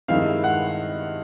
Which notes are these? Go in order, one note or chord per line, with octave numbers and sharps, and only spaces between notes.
G2 D#3 G#3 C4 E4 F5
F#5